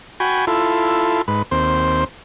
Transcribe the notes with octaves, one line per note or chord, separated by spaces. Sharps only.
F#4 G5 G#5 B5
E4 F4 A4
G#2 B4
D#2 C4 C5